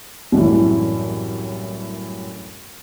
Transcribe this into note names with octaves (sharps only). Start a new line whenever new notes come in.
C2 F#2 A2 E3